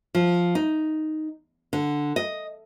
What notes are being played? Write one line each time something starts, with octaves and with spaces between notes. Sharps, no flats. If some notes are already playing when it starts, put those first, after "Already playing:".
F3
D#4
D3
D#5